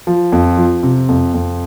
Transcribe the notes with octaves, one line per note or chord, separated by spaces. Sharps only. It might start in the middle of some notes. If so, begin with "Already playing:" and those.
F3
F2
F3
C3
F2
F2